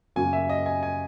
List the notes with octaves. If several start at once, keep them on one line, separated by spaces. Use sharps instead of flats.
F#2 C#3 F#3 A#3 G#5
E5
D#5
G#5
G#5